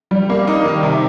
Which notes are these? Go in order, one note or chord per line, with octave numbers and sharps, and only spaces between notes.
G3
A#3
D#4
D#3
C3